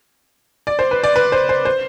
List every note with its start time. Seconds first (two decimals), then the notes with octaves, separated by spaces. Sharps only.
0.67 D5
0.79 C5
0.91 B4
1.04 D5
1.16 B4
1.32 C5
1.49 C5
1.65 C5